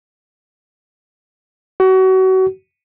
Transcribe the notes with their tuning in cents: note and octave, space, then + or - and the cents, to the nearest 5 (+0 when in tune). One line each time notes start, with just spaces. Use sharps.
F#4 +30